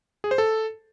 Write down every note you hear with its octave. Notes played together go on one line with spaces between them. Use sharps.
G#4
C5
A4